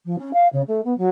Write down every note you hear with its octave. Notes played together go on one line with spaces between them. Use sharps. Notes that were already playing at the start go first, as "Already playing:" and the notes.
F3
C#4
F5
C#3
A3
B3
F#3